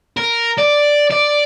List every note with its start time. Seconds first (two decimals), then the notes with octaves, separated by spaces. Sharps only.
0.17 A#4
0.58 D5
1.11 D5